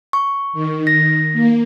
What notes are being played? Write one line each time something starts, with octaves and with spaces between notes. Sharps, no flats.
C#6
D#3
A#6
A#3